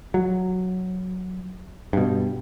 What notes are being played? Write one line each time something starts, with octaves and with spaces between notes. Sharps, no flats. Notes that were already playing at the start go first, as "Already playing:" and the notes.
F#3
G2 B2